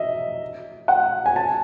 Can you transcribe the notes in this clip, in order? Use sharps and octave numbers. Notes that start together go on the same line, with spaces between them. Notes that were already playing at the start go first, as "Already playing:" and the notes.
Already playing: D#5 E5
F#5
G#5
A5